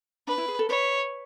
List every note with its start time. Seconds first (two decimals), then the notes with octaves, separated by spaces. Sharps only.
0.27 D4 B4
0.38 E4
0.48 G#4
0.59 A4
0.69 B4 C#5